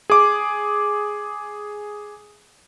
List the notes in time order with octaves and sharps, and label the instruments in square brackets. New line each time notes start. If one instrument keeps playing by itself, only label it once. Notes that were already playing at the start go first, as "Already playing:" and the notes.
[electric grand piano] G#4 D6